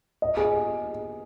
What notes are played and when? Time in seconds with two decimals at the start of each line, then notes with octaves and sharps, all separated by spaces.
0.22 D#5
0.37 G#4